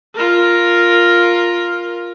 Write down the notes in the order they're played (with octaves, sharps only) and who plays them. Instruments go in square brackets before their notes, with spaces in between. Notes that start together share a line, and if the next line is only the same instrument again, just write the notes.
[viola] F4 A#4